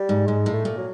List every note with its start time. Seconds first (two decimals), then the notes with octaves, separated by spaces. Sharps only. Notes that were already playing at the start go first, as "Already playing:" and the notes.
Already playing: G3
0.09 G#2
0.27 G#2 G#3
0.46 A2
0.53 A3
0.65 A#2
0.78 F#3